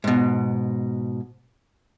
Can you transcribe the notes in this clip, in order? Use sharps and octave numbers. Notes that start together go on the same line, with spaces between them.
G#2 B2